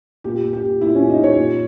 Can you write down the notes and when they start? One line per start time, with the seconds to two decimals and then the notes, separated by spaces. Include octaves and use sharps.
0.24 A#2 G4
0.43 A#2
0.53 G4
0.62 A#2
0.81 A#2 E4
0.95 C#4
1.00 A#2
1.10 D#4
1.19 A#2 C#5
1.38 A#2